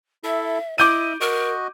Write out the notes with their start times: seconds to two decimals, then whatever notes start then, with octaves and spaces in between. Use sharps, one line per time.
0.24 E4 A4 E5
0.78 E4 D#5 E5 D6 G6 D#7
1.21 F#4 A#4 D#5